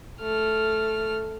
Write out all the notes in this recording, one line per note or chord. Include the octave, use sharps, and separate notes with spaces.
A3 F6